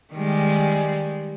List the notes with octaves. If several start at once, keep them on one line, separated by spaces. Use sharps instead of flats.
D#3 G3 G#3